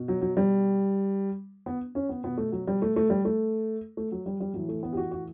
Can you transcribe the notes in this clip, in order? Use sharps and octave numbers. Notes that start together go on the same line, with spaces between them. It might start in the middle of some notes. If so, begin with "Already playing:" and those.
Already playing: B2
F#3
F#3
G3
B3
C#4
B3
B2 B3
A3
F#3
G3
A3
A3
G3
A3
A3
F#3
G3
G3
A2 E3 F#3
A3
B3
G4
F#4
F#4